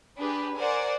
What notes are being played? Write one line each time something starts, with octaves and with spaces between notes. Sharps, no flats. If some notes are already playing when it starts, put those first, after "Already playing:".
D4 G4 G#4 B4
A#4 C5 D5 F#5 G#5